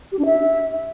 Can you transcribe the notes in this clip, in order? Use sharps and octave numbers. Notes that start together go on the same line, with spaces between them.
G4
D4
E5